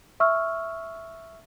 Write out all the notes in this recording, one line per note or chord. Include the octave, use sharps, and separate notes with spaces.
E5 C#6 E6 F6